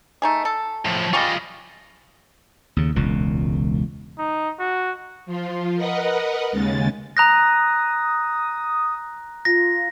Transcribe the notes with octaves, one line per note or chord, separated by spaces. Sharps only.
A3 D#4 G#4
A4
A2 F3
G3 G#3 F4 D#5 C#6
D#2 C#3
E1 C#2 A#2
D#4
F#4
F3 F4
A#4 B4 D#5 F#5
D#2 C#3 G#3 A6
A#5 D#6 F#6 A#6
F4 A#6